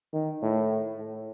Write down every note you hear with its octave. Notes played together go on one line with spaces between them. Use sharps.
D#3
A2
A2